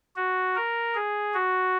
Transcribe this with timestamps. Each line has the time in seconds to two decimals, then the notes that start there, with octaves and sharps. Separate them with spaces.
0.16 F#4
0.55 A#4
0.95 G#4
1.34 F#4